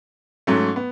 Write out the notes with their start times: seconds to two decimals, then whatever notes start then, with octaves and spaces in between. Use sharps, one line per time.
0.47 G#2 F#3 A3 C#4
0.76 B3